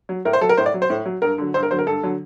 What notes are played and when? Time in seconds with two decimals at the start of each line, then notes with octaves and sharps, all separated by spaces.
0.09 F#3
0.25 A2 A#4
0.33 C5
0.41 F#3 A4
0.49 A#4
0.57 A2 C5
0.66 D5
0.74 F#3
0.82 C5
0.90 A2
1.06 F#3
1.22 G2 A#4
1.38 D3 F#3
1.54 G2 C5
1.63 A#4
1.71 D3 F#3 C5
1.79 A#4
1.86 G2 A4
2.03 D3 F#3